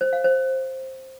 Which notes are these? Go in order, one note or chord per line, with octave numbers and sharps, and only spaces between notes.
C5
F5
C5